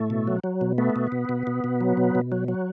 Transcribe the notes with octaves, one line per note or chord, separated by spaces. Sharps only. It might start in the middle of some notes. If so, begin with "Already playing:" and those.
Already playing: A2 A3
B2
F#3
F#3
B2
A3 B3
B2
B2
B2
B2
B2
F#3
B2
B2
F#3
F#3